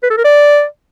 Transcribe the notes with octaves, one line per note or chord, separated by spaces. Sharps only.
B4
A4
A#4
D5